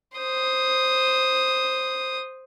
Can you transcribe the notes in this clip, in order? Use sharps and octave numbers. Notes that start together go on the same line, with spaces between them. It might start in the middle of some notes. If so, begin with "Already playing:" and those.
C5 D#6